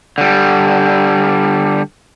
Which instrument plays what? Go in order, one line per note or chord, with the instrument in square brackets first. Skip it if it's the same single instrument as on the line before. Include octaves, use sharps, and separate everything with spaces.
[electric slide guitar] D3 G3